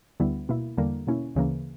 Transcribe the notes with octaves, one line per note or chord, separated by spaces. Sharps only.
D2 D3 G3 B3 E4
B2 A#3 E4
E2 D3 G3 A#3
B2 A#3 C#4 E4
D2 C#3 E3 A#3